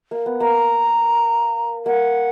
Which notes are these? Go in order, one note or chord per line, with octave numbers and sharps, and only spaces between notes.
A#3
B3
A#3 A#5
A#3 F#5